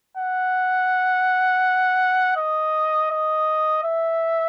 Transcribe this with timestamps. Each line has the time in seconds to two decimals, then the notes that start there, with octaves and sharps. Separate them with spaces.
0.17 F#5
2.37 D#5
3.11 D#5
3.84 E5